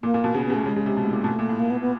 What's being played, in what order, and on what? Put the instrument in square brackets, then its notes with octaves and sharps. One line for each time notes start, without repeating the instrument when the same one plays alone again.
[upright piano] A#2 [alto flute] A#3
[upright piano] A#2
B2
[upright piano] C#3 [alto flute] B3
[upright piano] C#3 [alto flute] B3
[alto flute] A3
[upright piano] C#3 [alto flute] G#3
[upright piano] C#3
C3
B2
A2
A#2
B2
[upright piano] A#2 [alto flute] A3
[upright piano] A#2
A2
[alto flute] A#3
B3
B3